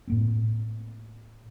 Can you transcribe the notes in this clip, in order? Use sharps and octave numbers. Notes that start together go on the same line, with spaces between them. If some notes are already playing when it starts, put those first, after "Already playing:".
A2 A#3 C4